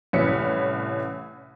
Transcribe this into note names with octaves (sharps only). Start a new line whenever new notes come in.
C2 A2 E3 C#4 B6 C#7